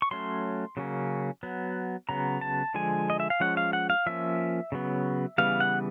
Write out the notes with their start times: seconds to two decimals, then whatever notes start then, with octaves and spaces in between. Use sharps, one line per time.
0.02 C#6
0.11 F#3 A3 C#4 C6
0.77 C#3 F#3 A#3 C#4
1.43 F#3 B3
2.09 C#3 F#3 B3 A#5
2.41 A5
2.74 D3 F3 G#3 G#5
3.10 D#5
3.20 E5
3.30 F5
3.40 F3 G#3 C#4 F#5
3.57 F5
3.73 F#5
3.90 F5
4.06 F3 A#3 C#4 E5
4.72 C#3 F#3 B3
5.38 C#3 E3 G3 B3 F5
5.60 F#5